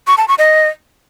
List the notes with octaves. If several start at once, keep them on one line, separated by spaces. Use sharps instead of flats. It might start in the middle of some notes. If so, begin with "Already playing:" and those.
C#6
A5
C#6
D#5